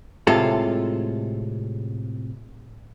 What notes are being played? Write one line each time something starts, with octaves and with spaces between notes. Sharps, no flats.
A2 C3 G#3 F4 A4